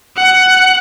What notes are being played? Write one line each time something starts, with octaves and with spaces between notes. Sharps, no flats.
F#5